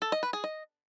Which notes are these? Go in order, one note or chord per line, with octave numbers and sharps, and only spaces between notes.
A4
D#5
B4
G#4
D#5